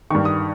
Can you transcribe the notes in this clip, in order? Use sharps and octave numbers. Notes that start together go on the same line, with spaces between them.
G2 D#3 C#6
D#6